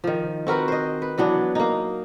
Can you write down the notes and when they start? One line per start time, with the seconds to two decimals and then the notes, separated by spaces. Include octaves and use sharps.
0.04 D#3 F3
0.47 C4 F#4 A#4 B4
0.68 C5 D#5
1.02 B4
1.18 E3 F#3 B3 D4
1.55 A#3 D#4